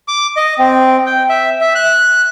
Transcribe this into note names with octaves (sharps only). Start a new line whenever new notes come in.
D6
D#5
C4
G5
E5
E5
F#6